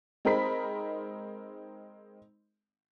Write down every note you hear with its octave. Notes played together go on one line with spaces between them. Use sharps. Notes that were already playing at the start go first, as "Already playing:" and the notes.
G#3 C4 D#4 A#4 B5 B6